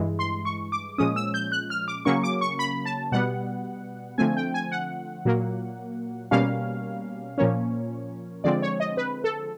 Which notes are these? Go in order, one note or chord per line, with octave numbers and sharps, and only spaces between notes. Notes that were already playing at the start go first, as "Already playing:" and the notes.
Already playing: G2 E3 G#3
C6
C#6
D6
A#2 F3 G#3 C#4 D#6
E6
G6
F#6
F6
D6
C#3 F#3 A#3 C#4 C#6
D6
C#6
B5
A5
B2 G3 B3 F#5
D3 F3 A3 C4 G#5
G5
G#5
F#5
A#2 F#3 A#3
B2 G3 A#3 C#4 F5
A#2 F3 A#3 C#4 C#5
D3 F3 G#3 C4 D5
C#5
D#5
B4
A4